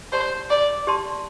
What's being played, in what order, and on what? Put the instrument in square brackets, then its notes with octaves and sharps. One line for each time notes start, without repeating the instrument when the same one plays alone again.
[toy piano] G4 D5 A5 C6 [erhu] C5
[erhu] D5
[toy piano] G4 D5 A5 C6